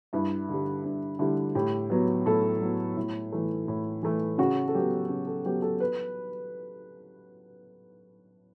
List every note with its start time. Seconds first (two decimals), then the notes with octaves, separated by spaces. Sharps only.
0.13 G2 E4
0.49 D3 G3
0.84 G2 D4
1.19 D3 G3 E4
1.55 A2 G4
1.90 F#3 B3
2.26 A2 A4
2.61 F#3 B3
2.97 A2 E4
3.32 E3 A3
3.68 A2
4.03 E3 A3
4.38 C#3 F#4
4.68 A4
4.75 F#3 B3 G4
5.09 C#3
5.27 A4
5.45 F#3 B3 G4
5.62 A4
5.80 B4